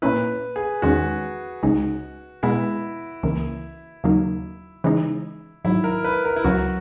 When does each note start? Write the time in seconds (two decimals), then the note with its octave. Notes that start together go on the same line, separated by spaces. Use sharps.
0.02 A#2 A#3 C#4 E4 B4
0.56 G#4
0.82 E2 D#3 G#3 C#4 F#4
1.63 C#2 C#3 G#3 D#4
2.43 B2 G#3 B3 E4
3.23 C#2 C#3 E3 A#3
4.04 D#2 C#3 F#3 A#3 D#4
4.84 C#3 E3 G#3 D#4
5.65 G#2 D#3 F#3 E4
5.84 A#4
6.04 B4
6.25 A#4
6.36 E4
6.44 C#2 C#3 F#3 F#4